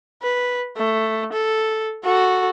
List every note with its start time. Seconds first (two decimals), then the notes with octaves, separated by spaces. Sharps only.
0.23 B4
0.77 A3
1.33 A4
2.04 F#4 A4